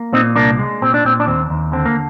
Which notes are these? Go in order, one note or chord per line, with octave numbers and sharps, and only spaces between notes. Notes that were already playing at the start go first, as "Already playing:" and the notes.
Already playing: A#3
A#2 C4 D#4
C2 A#3 D4
G#3
A#2 C4
D4
A#2 C4
D4
D#2 C4
D#2
D3 C4
A#3